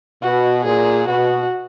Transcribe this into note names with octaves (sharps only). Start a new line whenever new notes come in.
B2 F#4
A#2 G#4
B2 F#4